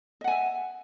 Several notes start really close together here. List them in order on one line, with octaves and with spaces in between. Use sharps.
D#5 F#5 G#5 E5